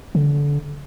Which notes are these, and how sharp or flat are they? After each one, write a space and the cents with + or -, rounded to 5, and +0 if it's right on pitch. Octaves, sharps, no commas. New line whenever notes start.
D3 -25